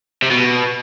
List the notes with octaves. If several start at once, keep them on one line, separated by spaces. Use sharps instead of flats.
C3
B2